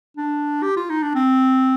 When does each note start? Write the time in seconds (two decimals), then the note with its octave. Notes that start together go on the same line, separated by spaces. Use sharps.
0.17 D4
0.63 G4
0.76 F4
0.89 D#4
1.03 D4
1.15 C4